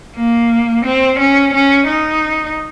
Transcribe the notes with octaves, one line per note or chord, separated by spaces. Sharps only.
A#3
C4
C#4
C#4
D#4